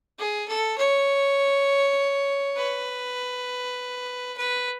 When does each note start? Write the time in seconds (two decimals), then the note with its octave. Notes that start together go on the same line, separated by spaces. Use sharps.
0.19 G#4
0.48 A4
0.78 C#5
2.57 B4
4.37 B4